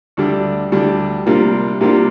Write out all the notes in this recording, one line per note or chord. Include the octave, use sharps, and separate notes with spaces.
D2 D3 G3 D4
D2 D3 G3 D4
C3 G3 A#3 D4 F4
C3 G3 A#3 D4 F4